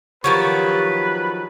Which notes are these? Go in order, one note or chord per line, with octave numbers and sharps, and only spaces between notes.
D#3 F3 F#3 G4 B4 C#6